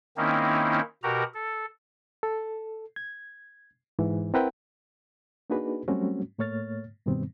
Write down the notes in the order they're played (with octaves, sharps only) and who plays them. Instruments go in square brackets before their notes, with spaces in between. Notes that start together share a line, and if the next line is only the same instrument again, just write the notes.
[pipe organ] D#3 A#3 C4 C#4 D#4 E4
B2 F#4 G4 A#4 A#5
A4
[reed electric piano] A4
G#6
G#2 E3
C4 E4 A#4 B4 F#5 G5
A#3 D4 D#4 F#4 G#4 B4
F#3 G3 A3 C4 C#4 F#4
A2 A3 A#3 C#5 F6 A6
G2 B2 D#3 G3 B3 C4